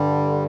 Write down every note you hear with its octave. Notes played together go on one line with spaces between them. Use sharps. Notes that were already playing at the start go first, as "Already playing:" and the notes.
Already playing: G2 D3 G3